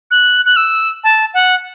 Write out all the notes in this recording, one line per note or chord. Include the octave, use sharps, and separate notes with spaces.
F#6
F#6
E6
A5
F#5